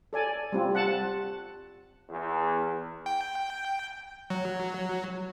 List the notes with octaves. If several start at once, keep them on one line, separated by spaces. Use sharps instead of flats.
A4 D5 G#5
G3 C4 F4
F#5 A5
E2
G5
F#3